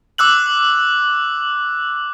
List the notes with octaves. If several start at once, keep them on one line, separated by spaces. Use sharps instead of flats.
D6 E6 F#6 F#7